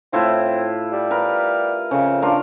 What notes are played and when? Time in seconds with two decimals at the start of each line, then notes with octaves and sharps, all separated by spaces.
0.13 A2 C4 E4 F4
0.92 G3
1.11 A#4 B4
1.91 F2 C#3
2.22 D4 F4 A#4